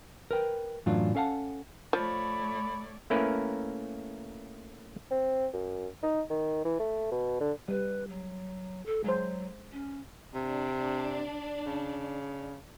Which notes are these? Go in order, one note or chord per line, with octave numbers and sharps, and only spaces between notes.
A#4 B4 G5
F#2 A2 E3 F#3 D4 F4
C#4 A4 F5 F#5 A5
F3 A3 C#5 D5 B5
A3 A#3 C#4 E4 A#4 B4
C4
F#2
D#4
D#3
E3
A3
B2
D3
G3 B4
F#3
A4
F#3 G#3 C5
C#4
C3 D4
C#3